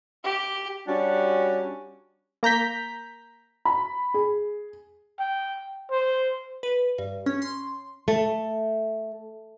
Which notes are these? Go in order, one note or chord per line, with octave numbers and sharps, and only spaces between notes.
G4
G3 C#4 D4 F#4
A#3 A#5 G6 B6
B5
G#4
G5
C5
B4
G2
C#4
C6
A3